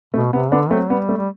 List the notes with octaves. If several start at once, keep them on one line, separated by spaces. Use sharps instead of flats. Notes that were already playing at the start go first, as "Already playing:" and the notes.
B2 A3
C3 B3
D3 B3 D4
F#3 A3 C4
G3 B3
A3
G3